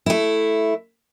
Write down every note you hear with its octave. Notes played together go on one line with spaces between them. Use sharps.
A3 E4